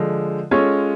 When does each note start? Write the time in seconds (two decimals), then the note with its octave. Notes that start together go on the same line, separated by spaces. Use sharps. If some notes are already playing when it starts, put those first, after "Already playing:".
Already playing: D3 F3 G#3
0.51 G#3 C#4 F4 A4 C#5